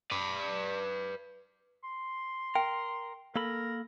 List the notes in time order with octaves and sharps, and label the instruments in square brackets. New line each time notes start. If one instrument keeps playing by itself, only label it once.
[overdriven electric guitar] B4 D5
[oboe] C6
[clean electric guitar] A#4 [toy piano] G5
[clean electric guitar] A#3 A4 B5 [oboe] A#4